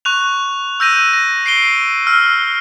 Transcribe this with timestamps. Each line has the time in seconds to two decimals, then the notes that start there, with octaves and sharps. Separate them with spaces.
0.05 C#6 F#6 F7
0.80 E6 G6 A#6 D#7
1.13 A#6
1.46 C7 D7 G7
2.07 E6 F6